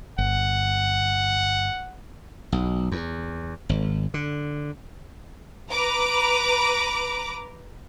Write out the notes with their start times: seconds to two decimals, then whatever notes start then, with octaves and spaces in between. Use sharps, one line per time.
0.18 G1 F#5
2.52 B1
2.92 E2
3.69 G#1
4.14 D3
5.71 B4 A#5 D6